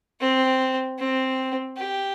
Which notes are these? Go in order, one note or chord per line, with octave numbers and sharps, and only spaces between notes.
C4
C4
G4